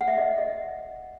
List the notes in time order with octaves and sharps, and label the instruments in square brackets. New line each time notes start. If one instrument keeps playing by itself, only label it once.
[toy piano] F#5
E5
D#5
D#5